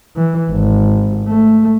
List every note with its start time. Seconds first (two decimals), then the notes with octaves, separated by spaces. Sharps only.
0.16 E3
0.50 G#1
1.28 A3